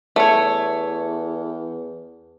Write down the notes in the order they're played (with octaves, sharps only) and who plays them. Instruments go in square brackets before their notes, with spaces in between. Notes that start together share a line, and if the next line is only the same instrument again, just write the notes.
[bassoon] E2 [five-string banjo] A3 C#5